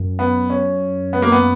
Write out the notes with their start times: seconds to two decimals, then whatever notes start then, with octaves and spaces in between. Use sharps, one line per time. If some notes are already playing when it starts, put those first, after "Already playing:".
Already playing: F#2
0.19 B3
0.50 C#4
1.13 B3
1.22 A#3
1.32 B3